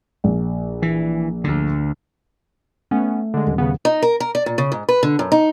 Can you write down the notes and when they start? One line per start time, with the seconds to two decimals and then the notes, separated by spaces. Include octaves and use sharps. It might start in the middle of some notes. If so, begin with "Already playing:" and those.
0.24 A#1
0.82 E3
1.44 D2 D3
2.91 A3 B3 C#4
3.34 D3 G#3
3.47 D#1
3.58 C#3 B3
3.85 D#4
4.02 A#4
4.20 A#4
4.35 D5
4.46 A#2
4.58 C#3
4.72 G#2
4.89 B4
5.03 D3
5.19 F#2
5.32 D#4